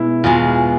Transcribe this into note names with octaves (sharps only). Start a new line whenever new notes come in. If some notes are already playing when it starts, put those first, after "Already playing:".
Already playing: B2 G#3 E4
E2 B2 G#3 F4